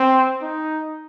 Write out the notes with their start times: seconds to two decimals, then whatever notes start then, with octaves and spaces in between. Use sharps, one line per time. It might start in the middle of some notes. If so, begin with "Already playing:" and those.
Already playing: C4
0.42 D#4